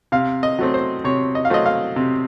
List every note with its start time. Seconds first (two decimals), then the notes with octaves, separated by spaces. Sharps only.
0.12 C3 F5
0.43 D#5
0.59 F#3 A3 C4
0.74 C5
1.04 C3 C#5
1.35 D#5
1.45 F5
1.50 F#3 A3 C4 D#5
1.66 F5
1.96 C3